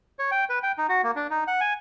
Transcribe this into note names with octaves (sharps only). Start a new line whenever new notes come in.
C#5
G5
B4
G5
D#4
F#4
A#3
D4
D#4
F#5
G#5